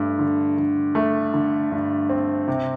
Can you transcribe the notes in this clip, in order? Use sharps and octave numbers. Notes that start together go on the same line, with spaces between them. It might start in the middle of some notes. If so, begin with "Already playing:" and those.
Already playing: G2 A3
D3
D3
A3
D3
G2
C4
C3